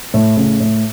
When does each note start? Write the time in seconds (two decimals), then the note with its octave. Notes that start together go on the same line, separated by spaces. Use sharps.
0.14 A2
0.37 A2 C#3
0.60 A2